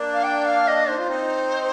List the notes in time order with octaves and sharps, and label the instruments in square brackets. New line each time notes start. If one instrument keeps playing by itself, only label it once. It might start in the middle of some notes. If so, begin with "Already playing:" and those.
Already playing: [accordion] A#3 D4
[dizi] F5
G5
F5
D#5
[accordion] D#4 [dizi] C5
[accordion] F4
C4 D#4